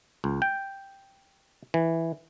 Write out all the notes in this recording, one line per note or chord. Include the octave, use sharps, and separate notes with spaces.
C#2
G5
E3